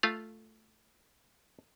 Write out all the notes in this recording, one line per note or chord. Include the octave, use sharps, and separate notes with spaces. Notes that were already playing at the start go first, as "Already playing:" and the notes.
A3 F4 F5